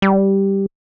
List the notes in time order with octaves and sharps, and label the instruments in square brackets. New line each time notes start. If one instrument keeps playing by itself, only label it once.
[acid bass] G3